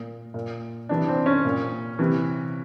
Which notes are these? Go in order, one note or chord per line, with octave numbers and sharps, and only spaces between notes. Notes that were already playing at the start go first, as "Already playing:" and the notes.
Already playing: A#2
A#2
C3 E3 D4
C4
C#4
A#2
C3 E3